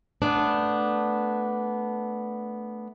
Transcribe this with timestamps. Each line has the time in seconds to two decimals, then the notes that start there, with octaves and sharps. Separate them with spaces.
0.22 A3 B3 D4